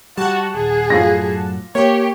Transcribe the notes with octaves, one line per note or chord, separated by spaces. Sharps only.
G3 F#4 F#5 A5
D#1 G#4
F#2 A2 F#3 F4 A#6
A#3 G4 C#5